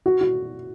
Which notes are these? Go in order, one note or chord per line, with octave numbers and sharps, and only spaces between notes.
F#4
F#4